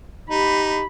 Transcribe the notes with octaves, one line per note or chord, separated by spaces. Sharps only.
D#4 G4 B5